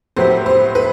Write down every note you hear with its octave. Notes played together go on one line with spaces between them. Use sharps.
A2 F#3 B3 E4 G4 C5
C5
B4